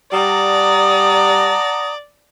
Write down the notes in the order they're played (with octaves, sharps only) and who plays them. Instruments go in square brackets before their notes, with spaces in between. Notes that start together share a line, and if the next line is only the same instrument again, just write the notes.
[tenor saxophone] G3 [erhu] D5 [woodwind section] F#5 A5 A#5 [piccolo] D#6